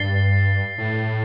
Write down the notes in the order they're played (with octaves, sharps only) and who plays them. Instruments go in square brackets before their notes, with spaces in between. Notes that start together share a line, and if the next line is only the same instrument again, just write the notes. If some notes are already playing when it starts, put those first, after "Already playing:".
Already playing: [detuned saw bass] G2 [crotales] A6 C7 G7
[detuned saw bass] A2